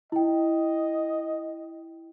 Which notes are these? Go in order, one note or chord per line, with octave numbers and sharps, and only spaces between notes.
E4 D#5 G5